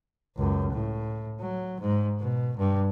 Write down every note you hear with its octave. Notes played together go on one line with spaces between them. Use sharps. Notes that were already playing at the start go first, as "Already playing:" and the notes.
C#2 F#2
A2
F#3
G#2
B2
G2